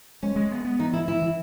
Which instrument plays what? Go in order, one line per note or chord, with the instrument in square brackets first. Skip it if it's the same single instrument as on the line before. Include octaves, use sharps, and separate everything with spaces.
[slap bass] G#3 [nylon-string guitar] C#4
[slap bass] G#3
B3
B3
[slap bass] E3 [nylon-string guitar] D#4
[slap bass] E3 [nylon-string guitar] E4
[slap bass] E3 [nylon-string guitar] E4
[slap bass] E3